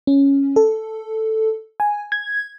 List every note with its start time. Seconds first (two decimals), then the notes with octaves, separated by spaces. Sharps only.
0.07 C#4
0.56 A4
1.80 G#5
2.12 G#6